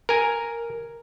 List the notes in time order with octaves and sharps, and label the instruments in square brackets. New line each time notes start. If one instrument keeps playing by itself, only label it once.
[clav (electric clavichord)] A#4 G#5